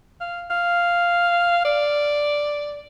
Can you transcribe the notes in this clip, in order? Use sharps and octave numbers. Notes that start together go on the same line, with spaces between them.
F5
F5
D5